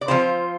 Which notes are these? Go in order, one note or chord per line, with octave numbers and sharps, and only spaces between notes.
D5
F3 C4 F4 C5